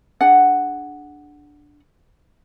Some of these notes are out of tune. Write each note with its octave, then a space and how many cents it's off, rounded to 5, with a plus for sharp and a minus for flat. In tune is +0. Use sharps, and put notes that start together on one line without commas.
D4 +0 G#4 +0 F#5 +0